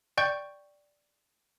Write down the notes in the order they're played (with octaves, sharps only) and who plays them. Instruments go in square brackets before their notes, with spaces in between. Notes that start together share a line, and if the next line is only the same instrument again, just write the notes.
[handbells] D5 G5 C#6 G6